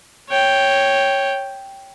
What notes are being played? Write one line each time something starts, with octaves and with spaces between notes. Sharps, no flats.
C#5 G5